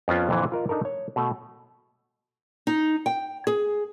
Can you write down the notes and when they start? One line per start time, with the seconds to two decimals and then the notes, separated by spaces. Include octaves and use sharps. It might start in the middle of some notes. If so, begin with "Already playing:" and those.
0.08 F2 B3 C#4 F4
0.29 F2 A#2 D3 E3
0.52 F4 A#4 D#5
0.69 D4 D#4 A4 A#4
0.85 C#5
1.16 B2 A3
2.67 D#4
3.06 G5
3.47 G#4